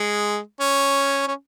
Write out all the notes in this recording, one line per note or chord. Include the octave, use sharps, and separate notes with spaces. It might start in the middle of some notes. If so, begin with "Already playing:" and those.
Already playing: G#3
C#4
C#4